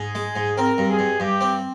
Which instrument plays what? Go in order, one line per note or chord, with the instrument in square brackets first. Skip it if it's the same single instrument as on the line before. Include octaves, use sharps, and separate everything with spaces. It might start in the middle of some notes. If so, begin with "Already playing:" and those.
Already playing: [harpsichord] G#2 [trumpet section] G#4
[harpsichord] G#3
G#2
[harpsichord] C4 [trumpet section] A#4
[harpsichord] G2
[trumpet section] G#4
[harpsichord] G2
[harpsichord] G2 [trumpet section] G4
[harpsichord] C4